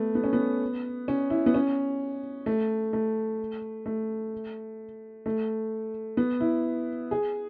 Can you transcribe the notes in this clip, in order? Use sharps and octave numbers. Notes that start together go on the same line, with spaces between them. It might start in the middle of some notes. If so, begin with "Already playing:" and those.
Already playing: A3 B3
B3
C#4
B3
C#4
E4
B3
C#4
A3
A3
A3
A3
B3
E4
G#4